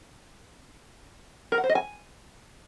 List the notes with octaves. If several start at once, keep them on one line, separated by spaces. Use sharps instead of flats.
A#4
F#5
C5
D#5
G#5